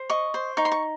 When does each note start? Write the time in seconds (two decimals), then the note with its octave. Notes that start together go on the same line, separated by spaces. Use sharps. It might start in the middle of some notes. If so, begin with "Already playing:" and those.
Already playing: C5
0.10 D#5 C#6
0.34 C5
0.57 D#4 C#6
0.65 C6
0.72 C#6